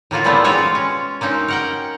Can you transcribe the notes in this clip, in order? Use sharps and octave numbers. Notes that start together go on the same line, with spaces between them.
A2 A#3 F4 F#4
A#2 E3 G3 A3 B3 C4
G#3 F4 F#4 C#5 F5
C#4
A#3 C4 C#4 D#4
A#4 F#5 G5